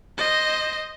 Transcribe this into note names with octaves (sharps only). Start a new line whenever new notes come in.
C5 D#5